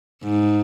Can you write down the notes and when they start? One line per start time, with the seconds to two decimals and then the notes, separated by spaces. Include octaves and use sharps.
0.23 G#2